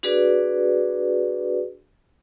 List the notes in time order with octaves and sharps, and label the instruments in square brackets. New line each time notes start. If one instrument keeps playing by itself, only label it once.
[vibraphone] D4 F#4 G#4 B4 D5